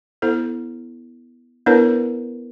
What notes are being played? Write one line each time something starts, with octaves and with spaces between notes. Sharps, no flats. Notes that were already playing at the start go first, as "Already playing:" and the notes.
B3 E4 A4 C5
B3 D4 E4 A#4 B4 C#5